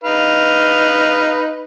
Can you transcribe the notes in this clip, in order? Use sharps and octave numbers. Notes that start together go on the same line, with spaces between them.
D#4 B4 F5